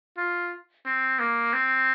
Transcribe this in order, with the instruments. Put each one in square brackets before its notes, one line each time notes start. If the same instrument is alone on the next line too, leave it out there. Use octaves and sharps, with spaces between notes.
[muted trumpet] F4
C4
A#3
C4